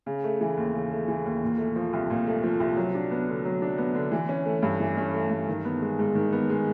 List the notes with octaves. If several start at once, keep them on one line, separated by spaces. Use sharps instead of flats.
C#3
A3
E3
D#2
C#3
A3
E3
D#2
A#2
A3
F3
C2
A#2
A3
F3
C2
F#3
D4
B3
D3
F#3
D4
B3
D3
E3
C#4
A3
G2
E3
C#4
A3
G2
D#3
B3
G#3
G#2
D#3
B3
G#3